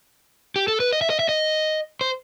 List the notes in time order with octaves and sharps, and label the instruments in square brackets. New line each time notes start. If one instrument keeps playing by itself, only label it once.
[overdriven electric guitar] G4
A4
B4
D#5
E5
D#5
E5
D#5
C5